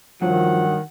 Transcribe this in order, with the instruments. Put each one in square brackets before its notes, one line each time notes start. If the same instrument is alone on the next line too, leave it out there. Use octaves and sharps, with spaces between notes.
[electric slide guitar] G2 F#3 F#4 [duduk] D#3 [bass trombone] F3 [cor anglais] F#5